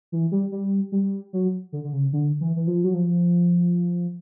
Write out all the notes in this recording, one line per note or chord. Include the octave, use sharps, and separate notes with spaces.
E3
G3
G3
G3
F#3
D3
D3
C#3
D3
E3
E3
F3
F#3
F3